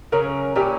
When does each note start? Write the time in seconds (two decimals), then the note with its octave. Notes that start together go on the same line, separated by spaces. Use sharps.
0.12 C#3 F#3 C#4 A#4
0.55 A#2 A#3 C#4 E4 G4